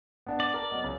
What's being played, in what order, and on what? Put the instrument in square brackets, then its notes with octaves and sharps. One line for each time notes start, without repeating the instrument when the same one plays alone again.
[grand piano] B3 D4 F#5
[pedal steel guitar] D5
[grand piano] A#4 A5
F#3 B3 D#5
C#2 F#3